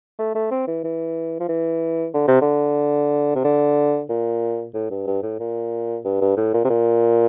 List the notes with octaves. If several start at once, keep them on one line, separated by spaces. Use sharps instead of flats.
A3
A3
C4
E3
E3
F3
E3
D3
C3
D3
C3
D3
A#2
A2
G2
G2
A2
A#2
G2
G2
A2
A#2
C3
A#2